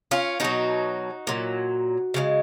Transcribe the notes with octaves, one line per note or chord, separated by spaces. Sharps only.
C#4 F4
B2 F#3 D#4 F#4
A#2 F#3
C#3 F3 G#3